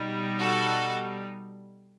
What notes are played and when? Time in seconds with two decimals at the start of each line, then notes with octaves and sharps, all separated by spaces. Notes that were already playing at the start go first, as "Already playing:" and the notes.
Already playing: B2 G3 D#4
0.40 F#4 A4